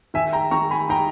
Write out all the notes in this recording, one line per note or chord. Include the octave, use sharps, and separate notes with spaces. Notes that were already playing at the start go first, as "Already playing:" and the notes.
D#3 E5 G#5
G5 A#5
D#3 A#5 C#6
G#5 B5
D#4 G5 A#5